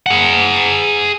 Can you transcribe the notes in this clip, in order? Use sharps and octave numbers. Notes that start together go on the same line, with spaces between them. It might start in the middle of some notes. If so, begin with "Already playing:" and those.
G#4 F#5